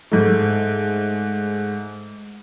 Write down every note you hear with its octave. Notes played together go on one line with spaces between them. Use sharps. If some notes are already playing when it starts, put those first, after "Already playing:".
G#2 A3